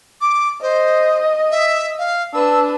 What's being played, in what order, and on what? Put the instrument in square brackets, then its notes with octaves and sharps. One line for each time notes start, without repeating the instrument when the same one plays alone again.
[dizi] D6
[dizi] C5 [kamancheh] D#5
[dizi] E5
F5
[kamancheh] D4 B4 [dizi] E6